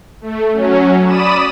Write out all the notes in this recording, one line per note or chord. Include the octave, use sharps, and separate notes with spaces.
A3
F#3 C#4
D5 B5 D#6 D#7 E7